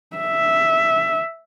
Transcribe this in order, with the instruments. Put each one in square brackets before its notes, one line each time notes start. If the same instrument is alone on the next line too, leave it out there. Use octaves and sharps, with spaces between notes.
[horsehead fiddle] E5